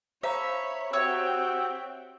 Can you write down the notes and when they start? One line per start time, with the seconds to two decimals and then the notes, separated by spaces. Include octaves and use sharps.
0.23 C5 C#5 E5 F5 A#5 B5
0.93 C4 F#4 G4 C#5 E5 G5 E6